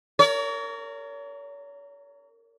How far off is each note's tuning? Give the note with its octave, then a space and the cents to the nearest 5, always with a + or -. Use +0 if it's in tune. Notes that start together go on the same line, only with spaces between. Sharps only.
A#4 -20 C#5 +40